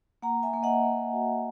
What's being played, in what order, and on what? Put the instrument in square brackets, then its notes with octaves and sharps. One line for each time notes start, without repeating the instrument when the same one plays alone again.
[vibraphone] A#3 F#5 A#5
E5 G#5
A#3
D#5 F#5
A#3
F#4